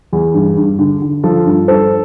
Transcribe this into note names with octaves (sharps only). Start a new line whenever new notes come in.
E2
G2
G2
D3
D3
F3 F4 A4
G2
G2 A4 C5